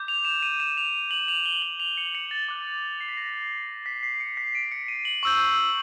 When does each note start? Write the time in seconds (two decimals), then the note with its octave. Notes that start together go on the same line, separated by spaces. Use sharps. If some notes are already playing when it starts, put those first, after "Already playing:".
Already playing: D6 G6
0.08 F7
0.25 E7
0.42 D#7
0.60 E7
0.77 F7
1.11 F#7
1.28 F7
1.46 G7
1.62 F#7
1.80 F7
1.98 C#7
2.15 C#7
2.31 A6
2.49 D6 F#6
3.01 C7
3.09 B6
3.17 A#6
3.86 B6
4.03 C7
4.20 C#7
4.37 B6
4.55 D7
4.72 C#7
4.88 D#7
5.05 F#7
5.23 C#6 E6 G6 F#7